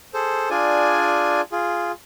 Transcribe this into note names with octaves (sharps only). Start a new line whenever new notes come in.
G#4 A4 C5
D4 F4 G#4 D5 G#5
F4 G#4